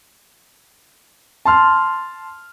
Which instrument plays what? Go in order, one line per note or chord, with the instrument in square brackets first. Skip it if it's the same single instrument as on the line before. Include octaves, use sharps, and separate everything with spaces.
[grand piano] A5 C6 F6